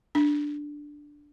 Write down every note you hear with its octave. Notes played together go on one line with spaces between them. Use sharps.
D4